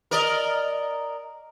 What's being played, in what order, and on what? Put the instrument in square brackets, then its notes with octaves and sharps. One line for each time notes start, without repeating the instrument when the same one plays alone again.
[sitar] A#4 D5 D#5